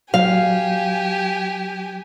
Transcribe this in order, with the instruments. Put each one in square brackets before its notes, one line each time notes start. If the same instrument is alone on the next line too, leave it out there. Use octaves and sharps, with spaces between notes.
[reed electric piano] F#3 [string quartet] G4 G#5 [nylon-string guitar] F5